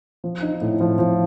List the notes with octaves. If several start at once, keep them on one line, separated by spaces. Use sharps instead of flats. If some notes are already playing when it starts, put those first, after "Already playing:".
F3
D#4
A2
F3
F3